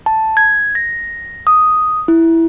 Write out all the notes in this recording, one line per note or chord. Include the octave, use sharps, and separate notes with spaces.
A5
G#6
A#6
D#6
E4